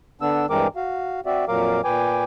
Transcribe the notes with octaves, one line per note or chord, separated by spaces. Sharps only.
D3 B3 D4 E6
G2 E3 G#3 C4 A#4 D6
F#4 F5
C4 F#4 D5 E5
F2 A#2 F#3 A#4 F5 D6
A#2 B4 G5 G#5 D6